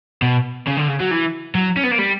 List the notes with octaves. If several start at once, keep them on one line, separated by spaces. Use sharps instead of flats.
B2
C#3
D3
C#3
F#3
E3
F#3
C#4
B3
A#3
G3